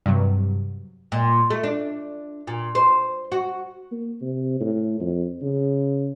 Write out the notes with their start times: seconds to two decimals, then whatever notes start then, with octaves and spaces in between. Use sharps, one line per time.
0.06 G2 C3 F#3
1.12 A#2
1.50 A3
1.63 D4
2.47 A#2
2.75 C5
3.32 F#4
3.92 A#3
4.22 C3
4.61 A2
5.01 F2
5.42 C#3